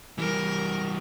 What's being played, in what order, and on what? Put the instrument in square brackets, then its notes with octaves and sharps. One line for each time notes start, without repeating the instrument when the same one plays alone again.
[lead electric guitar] E3 G3 [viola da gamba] A#4